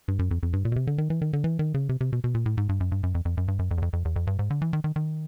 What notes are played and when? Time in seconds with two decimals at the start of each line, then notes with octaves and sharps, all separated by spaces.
0.08 G2
0.19 F#2
0.31 F2
0.43 F2
0.53 G2
0.65 A#2
0.72 B2
0.76 C3
0.87 D3
0.98 D#3
1.10 E3
1.22 D#3
1.33 D3
1.44 E3
1.59 D#3
1.74 C#3
1.89 C3
2.01 C3
2.13 B2
2.24 B2
2.35 A#2
2.46 A2
2.58 G#2
2.69 G2
2.80 F#2
2.92 G2
3.03 F#2
3.15 F2
3.25 F2
3.37 F#2
3.48 G2
3.59 F#2
3.71 F2
3.78 E2
3.82 F2
3.93 F2
4.05 E2
4.16 F2
4.27 G2
4.39 G#2
4.50 D3
4.62 E3
4.73 D#3
4.84 D#3
4.96 D#3